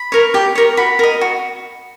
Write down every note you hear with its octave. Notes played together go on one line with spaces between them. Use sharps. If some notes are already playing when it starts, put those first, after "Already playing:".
Already playing: B5
A#4 C#5
G4
A#4 C#5
F#4 B5
A#4 D#5
F#4